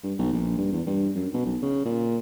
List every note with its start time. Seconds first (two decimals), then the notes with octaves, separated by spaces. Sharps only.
0.04 G2
0.19 B1
0.33 A#1
0.58 G2
0.72 E2
0.86 G2
1.15 F#2
1.34 B2
1.46 B1
1.62 C#3
1.85 A#2